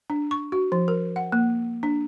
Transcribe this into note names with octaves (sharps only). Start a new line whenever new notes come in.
D4
C#6
F#4
F3
A#4
F#5
A#3
D4